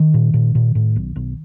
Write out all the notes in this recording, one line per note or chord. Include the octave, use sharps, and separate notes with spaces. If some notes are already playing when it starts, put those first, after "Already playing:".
Already playing: D#3
A#2
A#2
A#2
A2
B1
B1